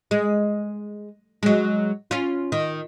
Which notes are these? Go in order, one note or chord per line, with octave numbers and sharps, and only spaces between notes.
G#3
F#3 G#3
C#4 F4
D#3